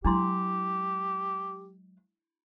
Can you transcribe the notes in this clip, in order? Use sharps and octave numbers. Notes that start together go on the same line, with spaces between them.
F#3 G#3 D4 E4 G4 C6